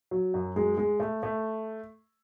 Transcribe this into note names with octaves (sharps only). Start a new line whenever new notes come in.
F#3
F#2
G#3
G#3
A3
A3